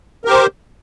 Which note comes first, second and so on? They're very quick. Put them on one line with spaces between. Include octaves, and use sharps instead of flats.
A#4 G4 C5